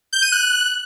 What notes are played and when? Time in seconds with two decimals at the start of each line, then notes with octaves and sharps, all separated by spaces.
0.13 G6
0.22 D#7
0.32 F#6